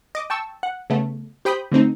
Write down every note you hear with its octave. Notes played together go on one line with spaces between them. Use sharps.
D#5 D6
G5 A5 C#6 E6
F#5
C#3 A3 B3
G4 C5 G5 B5 D#6 G6
D3 A3 C4 D#4